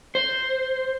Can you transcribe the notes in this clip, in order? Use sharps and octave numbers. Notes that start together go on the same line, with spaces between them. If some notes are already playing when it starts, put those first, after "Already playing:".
C5